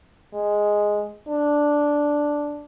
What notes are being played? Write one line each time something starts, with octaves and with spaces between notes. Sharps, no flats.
G#3
D4